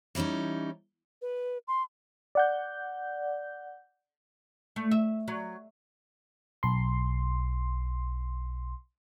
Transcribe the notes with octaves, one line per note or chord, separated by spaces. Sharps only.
E3 G3 C4 C#4 D#4
B4
C6
D5 F#5 G6
A3
E5
F#3
B1 C6